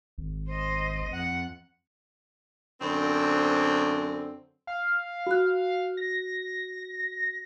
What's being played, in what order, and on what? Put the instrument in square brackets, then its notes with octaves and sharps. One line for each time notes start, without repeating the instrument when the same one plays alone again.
[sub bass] G#1
[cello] C5 D#5
F2 F#5
[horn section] F#2 D3 C4
[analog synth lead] F5
[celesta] F#4 F#6
[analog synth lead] A#6